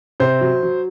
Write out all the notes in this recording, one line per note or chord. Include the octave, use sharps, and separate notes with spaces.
C3 C5
F#3
F#3